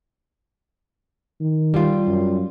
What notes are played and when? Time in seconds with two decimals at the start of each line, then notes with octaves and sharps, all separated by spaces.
1.41 D#3
1.74 G3 F4
2.07 F#2